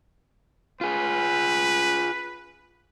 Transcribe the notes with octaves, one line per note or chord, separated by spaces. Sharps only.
F4 G#4 B4